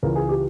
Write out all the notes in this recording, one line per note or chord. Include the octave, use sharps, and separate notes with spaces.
C#2 C#3 E3 A#4
G#4
G4